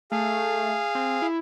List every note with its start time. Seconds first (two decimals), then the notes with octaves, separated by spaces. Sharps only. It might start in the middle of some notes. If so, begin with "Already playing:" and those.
0.12 A3 G#4 F5
0.95 C4
1.22 E4